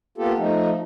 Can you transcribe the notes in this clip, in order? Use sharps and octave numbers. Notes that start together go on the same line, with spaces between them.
A#3 B3 F4 G4 A4
F3 A3 D#4